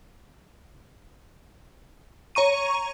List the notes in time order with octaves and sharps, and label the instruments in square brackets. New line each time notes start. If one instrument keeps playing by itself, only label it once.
[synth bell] C#5 A#5 C#6 D#7